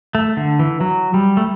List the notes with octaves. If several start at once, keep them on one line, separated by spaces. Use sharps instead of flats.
A3
D3
E3
F#3
G3
A3